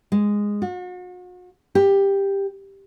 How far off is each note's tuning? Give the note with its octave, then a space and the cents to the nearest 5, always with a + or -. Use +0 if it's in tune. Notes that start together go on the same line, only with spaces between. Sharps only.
G#3 -10
F#4 -40
G4 +10